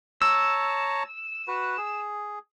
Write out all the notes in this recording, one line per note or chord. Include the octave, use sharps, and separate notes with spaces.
C#5 A5 A#5 E6
F#4 B4
G#4